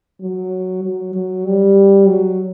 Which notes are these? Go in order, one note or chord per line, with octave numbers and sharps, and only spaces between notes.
F#3
F#3
F#3
G3
F#3